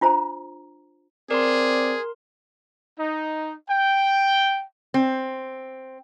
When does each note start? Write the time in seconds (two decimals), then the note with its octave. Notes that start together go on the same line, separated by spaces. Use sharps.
0.01 D4 F4 C5 A#5
1.31 C4 G#4 A#4 D5 C6
2.99 D#4
3.69 G5
4.94 C4